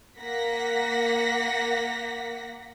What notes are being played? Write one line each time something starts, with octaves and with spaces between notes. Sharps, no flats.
A#3 F#5 A#6 B6